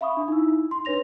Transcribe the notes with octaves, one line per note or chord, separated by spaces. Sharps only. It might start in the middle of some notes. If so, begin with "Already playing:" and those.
E5 F5 B5 C#6 D#6
D4
D#4 E4 E6
C6
D4 B4 C#5 A#6 F7